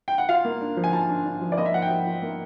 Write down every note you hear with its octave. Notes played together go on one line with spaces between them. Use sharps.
G5
F#5
F4 F5
A#3
D4
F3
G#5
F4 A5
D4
D4
F3
D5
A#3 D#5
E5
F3 F#5
G5
F3
F3
A#3